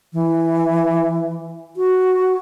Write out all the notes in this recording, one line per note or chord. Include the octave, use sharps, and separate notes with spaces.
E3
F#4